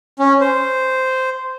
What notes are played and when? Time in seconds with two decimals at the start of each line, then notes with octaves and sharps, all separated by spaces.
0.19 C#4
0.41 C5